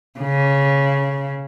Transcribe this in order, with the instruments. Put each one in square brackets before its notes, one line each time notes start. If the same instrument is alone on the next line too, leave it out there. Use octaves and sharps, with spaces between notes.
[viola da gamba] C#3